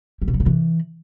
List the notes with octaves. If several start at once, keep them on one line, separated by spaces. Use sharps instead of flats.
G3
B2
F#3
C3
E3